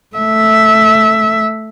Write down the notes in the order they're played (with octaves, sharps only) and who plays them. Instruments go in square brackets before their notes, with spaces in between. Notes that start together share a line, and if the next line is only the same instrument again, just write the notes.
[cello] A3 E5